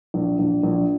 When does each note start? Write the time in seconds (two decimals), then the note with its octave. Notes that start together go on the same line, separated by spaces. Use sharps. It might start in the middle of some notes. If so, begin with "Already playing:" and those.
0.14 A#1
0.39 A#1
0.63 A#1